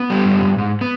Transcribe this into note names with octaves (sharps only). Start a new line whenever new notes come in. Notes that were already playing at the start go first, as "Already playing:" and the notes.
Already playing: B3
G3
G2
G2
G#2
B3